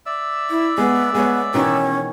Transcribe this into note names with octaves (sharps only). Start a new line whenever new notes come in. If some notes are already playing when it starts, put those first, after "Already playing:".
D5 E5 E6
E4
G#3 B3
G#3 B3 C#5
B2 D#3 E3 C#4